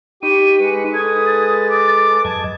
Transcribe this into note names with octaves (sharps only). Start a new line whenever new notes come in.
D#4 G4 G5 B5 C#6 D#7
G#3 B4
A4 D#6 G#6
A6
D6
F#2 D#5 A5 G#6